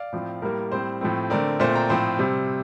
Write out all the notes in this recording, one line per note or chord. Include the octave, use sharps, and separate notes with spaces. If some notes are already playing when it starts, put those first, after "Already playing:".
Already playing: D5 F5
A2 F3 C4
A2 G3 A#3 A#4
A2 G3 C4 C5
A2 F3 A3 C4
D3 A3 C4 A#4 D5
A#2 A3 C4 C5 E5
G5 A#5
A2 F3 C4 C5
C3 G3 C4